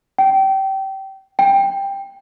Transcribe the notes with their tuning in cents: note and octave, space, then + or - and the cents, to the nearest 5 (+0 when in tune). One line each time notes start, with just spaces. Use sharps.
G5 -25
G5 +10